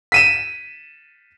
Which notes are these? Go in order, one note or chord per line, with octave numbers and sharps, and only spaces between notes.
B6 D#7 E7